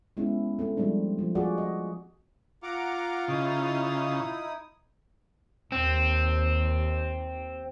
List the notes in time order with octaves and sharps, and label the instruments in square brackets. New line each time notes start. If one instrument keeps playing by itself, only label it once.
[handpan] G#3 B3 C#4 E4
A3 C4
F3 G3 G#3 C4 D4
F3
F4 F#4 G#4 D5
D#5
[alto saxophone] F4 [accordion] F#5 A#5 D6
[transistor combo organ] C#3 [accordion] D#4 E4 D#6
[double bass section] D#2 [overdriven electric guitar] C4